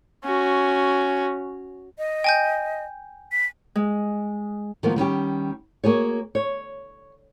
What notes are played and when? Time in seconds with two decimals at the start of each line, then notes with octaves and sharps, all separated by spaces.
0.24 C#4 F#4
1.98 D#5
2.24 G5 G#5 G6
3.32 B6
3.75 G#3
4.83 D#3 F3 F#3 G#3 A#3 B3
4.96 D#3 G3 C#4 G4
5.84 A#3 F#4 G#4 C#5
6.35 C#5